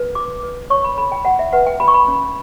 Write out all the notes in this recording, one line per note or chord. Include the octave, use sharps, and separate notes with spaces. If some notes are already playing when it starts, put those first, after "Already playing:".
Already playing: B4
F#4 D6
B4
C#5 C#6
B5
A4 B5
G5
F#4 F#5
E5
B4 F#5
G5
F#4 B5
C#6
B5
C#4